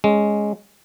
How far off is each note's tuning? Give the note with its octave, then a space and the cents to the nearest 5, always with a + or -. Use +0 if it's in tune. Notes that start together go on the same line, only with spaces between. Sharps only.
G#3 +0 C#4 +0